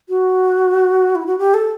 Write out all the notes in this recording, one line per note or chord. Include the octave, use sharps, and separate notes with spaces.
F#4
E4
F#4
G4
A4